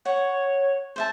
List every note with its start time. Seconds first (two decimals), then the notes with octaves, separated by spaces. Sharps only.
0.05 C#5 F#5
0.96 C5 E5 A5